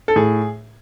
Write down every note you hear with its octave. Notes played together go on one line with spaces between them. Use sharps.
A4
A2 G#4